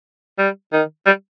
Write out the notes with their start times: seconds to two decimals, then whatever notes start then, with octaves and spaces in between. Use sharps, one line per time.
0.38 G3
0.72 D#3
1.06 G3